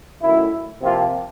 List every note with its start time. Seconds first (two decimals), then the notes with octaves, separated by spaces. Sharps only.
0.22 F#2 D#3 F#3 A3 E4
0.83 C3 F3 A#3 F4